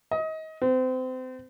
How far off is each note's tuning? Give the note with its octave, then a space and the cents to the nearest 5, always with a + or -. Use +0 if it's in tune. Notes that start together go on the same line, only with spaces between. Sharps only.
D#5 +30
C4 -30